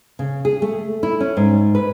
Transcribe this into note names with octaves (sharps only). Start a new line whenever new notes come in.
C#3
G#4
A3
E4
C#4
G#2
B4